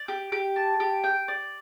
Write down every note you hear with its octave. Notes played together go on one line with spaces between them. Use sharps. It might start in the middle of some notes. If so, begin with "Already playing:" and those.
Already playing: D5
G4
G4
A5
G4
G5
D5